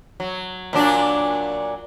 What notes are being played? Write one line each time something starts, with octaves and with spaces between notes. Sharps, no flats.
F#3
A#2 F#3 D4